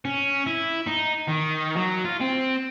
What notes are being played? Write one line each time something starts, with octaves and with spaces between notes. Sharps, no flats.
C#4
E4
D#4
D#3
F#3
F4
C4